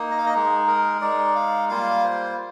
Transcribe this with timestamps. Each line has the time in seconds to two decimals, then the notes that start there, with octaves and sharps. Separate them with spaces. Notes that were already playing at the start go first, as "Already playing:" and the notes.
Already playing: A#3 D#4
0.11 D#5
0.18 F5
0.26 D#5
0.33 G#3 D#4
0.68 A#4
1.01 G#3 D#4 D5
1.35 F5
1.69 G3 A#3 F4 F5
2.04 C5